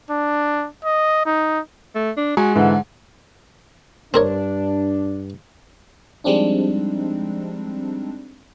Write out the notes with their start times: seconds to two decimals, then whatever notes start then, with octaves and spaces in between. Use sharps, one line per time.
0.11 D4
0.85 D#5
1.26 D#4
1.95 A3
2.17 D4
2.37 G#3 F#4 G#5
2.55 G#2 D3 E3
4.14 G2 C4 D4 A#4 C#5
6.24 F3 G3 G#3 C4 D4 D#4